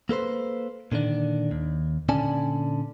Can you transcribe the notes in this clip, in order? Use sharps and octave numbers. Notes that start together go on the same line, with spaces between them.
A#3 A4 B4 C5
A#2 D3 D#3 D4
D#2
A#2 D3 C#4 D5 G#5 A5